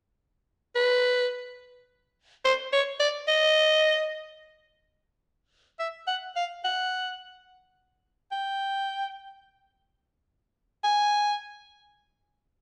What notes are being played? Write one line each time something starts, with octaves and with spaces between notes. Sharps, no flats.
B4
C5
C#5
D5
D#5
E5
F#5
F5
F#5
G5
G#5